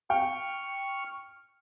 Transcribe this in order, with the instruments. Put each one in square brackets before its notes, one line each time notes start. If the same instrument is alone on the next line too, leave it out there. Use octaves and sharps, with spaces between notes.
[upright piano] G5 [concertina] C#6 F6